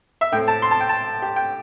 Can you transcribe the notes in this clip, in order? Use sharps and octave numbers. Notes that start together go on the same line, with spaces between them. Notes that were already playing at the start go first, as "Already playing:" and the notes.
E5
A2 A3 C4 G5
A5
C6
A5
G5
A5
G4
G5